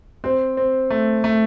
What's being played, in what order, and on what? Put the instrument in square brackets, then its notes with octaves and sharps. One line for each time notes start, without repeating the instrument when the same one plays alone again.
[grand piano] C4 [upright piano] C5
[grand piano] C4
A3
A3